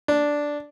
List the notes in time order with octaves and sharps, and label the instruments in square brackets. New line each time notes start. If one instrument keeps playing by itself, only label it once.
[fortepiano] D4